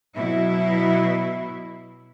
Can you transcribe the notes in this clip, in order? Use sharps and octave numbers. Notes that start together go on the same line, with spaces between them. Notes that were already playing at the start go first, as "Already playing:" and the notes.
B2 F#3 E4